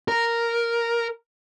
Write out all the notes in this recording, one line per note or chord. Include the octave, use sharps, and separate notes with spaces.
A#4